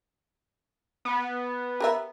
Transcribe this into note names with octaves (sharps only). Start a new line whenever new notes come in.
B3
G4 A#4 E5